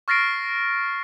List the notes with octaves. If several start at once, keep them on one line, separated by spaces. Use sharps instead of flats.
C#6 F6 A6 A#6 C7 D7